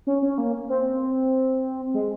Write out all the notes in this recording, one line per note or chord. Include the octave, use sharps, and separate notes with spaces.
C#4
C#4
A#3
C4
G#3